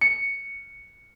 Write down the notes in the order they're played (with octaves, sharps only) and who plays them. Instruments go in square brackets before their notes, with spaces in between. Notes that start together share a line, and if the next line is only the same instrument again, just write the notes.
[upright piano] C#7